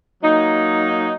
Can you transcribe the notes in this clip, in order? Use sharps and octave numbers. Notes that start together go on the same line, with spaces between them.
F#3 A#3 D#4